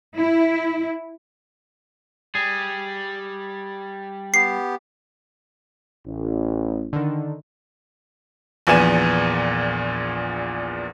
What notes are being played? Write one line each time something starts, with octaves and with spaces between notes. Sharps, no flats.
E4
G3 G#4
B3 G4 C7
A1
D3 D#3
A#1 E2 A#2 B3 G#5 E7